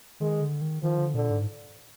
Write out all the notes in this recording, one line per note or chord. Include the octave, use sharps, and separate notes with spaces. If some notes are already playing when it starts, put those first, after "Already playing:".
D#3 G#3
D3
D#3
D#3 F3
D3
A#2 D3
G#2